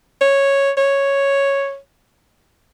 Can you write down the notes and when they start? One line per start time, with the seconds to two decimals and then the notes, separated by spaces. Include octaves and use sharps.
0.21 C#5
0.77 C#5